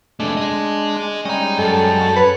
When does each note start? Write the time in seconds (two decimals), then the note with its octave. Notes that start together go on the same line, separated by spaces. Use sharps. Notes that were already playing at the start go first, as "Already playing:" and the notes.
0.20 F2 G#3 A3 D4
0.37 G#4 D#5
1.25 G3 G#3 C#4 D#5 A#5
1.58 F#2 A4
2.16 B4 C#5